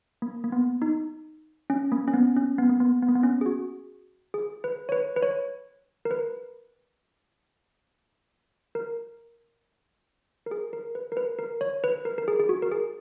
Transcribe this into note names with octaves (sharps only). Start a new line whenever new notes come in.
A#3
A#3
B3
D#4
C#4
A#3
C#4
B3
C#4
B3
A#3
B3
B3
A#3
B3
C#4
G#4
F#4
G#4
B4
C#5
B4
B4
C#5
A#4
B4
A#4
A#4
G#4
A#4
B4
A#4
B4
A#4
C#5
B4
A#4
A#4
G#4
G#4
F#4
A#4
G#4